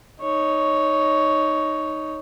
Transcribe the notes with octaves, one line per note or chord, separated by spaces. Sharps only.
D#4 C#5